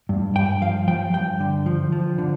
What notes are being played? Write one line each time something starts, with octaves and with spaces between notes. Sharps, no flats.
G2
G2 G5
F3 F5
F3 G5
G2 G5
D3
F3
F3
D3